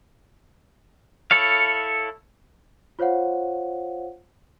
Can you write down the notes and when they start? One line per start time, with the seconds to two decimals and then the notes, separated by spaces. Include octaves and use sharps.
1.31 E4 A4 C#5 F5
2.99 F4 C5 C#5 F5 F#5